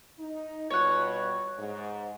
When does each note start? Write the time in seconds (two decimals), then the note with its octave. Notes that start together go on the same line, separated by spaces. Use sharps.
0.19 D#4
0.70 B2 G3 F4 C#5 F#5
1.58 G#2